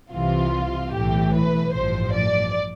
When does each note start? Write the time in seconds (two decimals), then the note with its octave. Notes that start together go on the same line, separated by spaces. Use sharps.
0.12 C2 C3 E3 F4
0.93 B1 A2 E3 G4
1.34 B4
1.74 A1 G2 F3 C5
2.14 D5